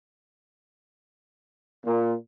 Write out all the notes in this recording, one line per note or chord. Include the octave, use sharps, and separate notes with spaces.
A#2